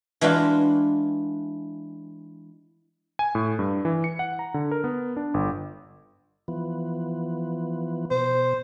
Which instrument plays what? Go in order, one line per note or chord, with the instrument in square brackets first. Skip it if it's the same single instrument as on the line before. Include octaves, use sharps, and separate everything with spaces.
[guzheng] E3 G#3 D4 F4 F#4
[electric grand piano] G#5
A2
G2
E3
C#7
F#5
A#5
D3
A#4
B3
D4
G1
[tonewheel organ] E3 F3 B3
[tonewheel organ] B2 [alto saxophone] C5